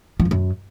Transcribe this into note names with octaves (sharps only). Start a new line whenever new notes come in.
F3
F2
F#2